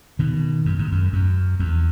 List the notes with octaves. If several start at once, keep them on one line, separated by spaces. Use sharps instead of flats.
B2 D#3
F#2
G#2
F#2
F#2
E2